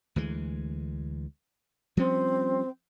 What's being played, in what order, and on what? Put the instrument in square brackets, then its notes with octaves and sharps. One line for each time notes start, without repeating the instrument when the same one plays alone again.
[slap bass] D2 E3 G#3
[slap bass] F3 G3 C#4 [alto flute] C4